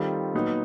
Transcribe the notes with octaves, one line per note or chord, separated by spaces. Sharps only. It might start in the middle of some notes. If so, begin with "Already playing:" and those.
Already playing: D#3 G3 C4 F4 A4
A#2 F#3 B3 D#4